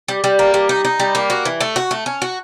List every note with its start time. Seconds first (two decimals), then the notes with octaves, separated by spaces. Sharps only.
0.08 G3
0.24 G3
0.39 A#3
0.54 G3
0.69 D#4
0.85 D#4
1.00 G3
1.15 A#3
1.30 F#4
1.45 E3
1.61 A3
1.76 F#4
1.91 A3
2.06 C#4
2.22 F#4